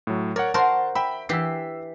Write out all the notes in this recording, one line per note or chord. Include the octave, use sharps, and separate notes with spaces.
A2 F#3
A#4 C#5 D5 F#5
F#4 A#4 C5 A5 C6
E5 G5 B5
E3 G4 E6 B6 C7